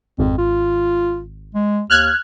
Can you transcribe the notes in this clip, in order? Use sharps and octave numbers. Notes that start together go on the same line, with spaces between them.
G#1 F2
F4
G#3
D#2 F6 F#6 G#6